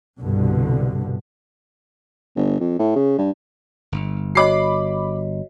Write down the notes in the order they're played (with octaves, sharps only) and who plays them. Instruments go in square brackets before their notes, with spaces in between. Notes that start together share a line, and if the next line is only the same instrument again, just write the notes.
[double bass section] C2 G2 B2 D3
[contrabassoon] G1
F2
A2
C#3
G2
[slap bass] G1
[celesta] F#4 C#5 D#5 [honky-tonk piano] B5 D6 C7